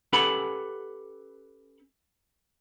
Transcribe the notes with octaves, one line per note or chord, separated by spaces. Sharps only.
C#4 G4 A4 B4 F#5 B5